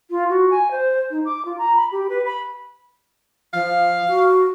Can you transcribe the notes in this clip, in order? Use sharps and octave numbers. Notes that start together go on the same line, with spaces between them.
F4
F#4
G#5
C5
D#4
D6
F4
A#5
B5
G4
B4
B5
F3 F5
F#4